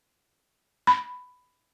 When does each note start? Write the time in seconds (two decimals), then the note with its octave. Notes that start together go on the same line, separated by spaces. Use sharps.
0.87 B5